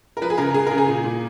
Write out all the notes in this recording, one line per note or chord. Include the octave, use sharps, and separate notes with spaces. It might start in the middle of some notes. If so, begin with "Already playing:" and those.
A#4
F3 B4
G#4
C#3 A#4
C#3 G#4
C#3 A#4
G#4
A#2
A#2